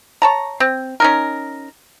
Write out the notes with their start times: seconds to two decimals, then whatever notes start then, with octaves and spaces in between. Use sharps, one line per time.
0.22 C#5 A5 A#5
0.60 C4
1.00 C#4 D#4 A#4